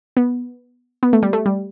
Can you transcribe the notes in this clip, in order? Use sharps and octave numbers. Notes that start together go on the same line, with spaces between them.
B3
B3
A3
G3
A3
G3